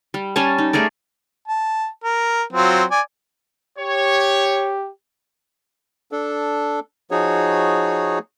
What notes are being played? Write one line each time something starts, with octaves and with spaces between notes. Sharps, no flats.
G3
G3 C#4 G#5 A5
D#4
A3 G#4 A#4 D5
A5
A#4
F#3 C4 F4
D5 G#5
G4 C#5
D4 A4
F3 D#4 F#4 G#4 C#5